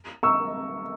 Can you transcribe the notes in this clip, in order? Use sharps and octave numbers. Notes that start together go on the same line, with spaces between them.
C#6 E6